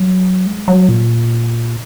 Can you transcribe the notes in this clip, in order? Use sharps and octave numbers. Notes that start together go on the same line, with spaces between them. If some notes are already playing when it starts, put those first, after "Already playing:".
Already playing: F#3
G#3
F#3
A#2